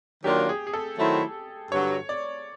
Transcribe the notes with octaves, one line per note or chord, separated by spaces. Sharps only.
D#3 F#3 A#3 D4 F4 G4
G#4
G#4
A4
D#3 F#3 A3 C4 E4
G2 D3 F#3 C#5
D5